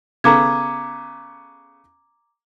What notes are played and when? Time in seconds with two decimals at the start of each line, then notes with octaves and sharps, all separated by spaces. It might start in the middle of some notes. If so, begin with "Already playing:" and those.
0.24 C#3 B3 A4 A#5 D6 G#6